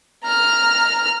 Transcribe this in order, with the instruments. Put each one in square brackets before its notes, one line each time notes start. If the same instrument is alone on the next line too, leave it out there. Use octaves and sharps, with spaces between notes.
[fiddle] A#5 F6